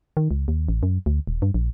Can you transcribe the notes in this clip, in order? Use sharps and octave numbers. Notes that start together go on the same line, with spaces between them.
D#3
C#2
D#2
A1
F#2
D2
D#1
G2
A#1